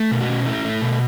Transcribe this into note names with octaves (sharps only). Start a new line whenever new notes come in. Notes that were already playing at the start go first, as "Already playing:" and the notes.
Already playing: A3
B2
F#4
C#4
A3 E4
A3
B2